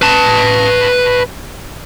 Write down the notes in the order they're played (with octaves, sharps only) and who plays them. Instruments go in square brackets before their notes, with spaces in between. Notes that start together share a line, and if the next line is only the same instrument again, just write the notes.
[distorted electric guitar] B4 A5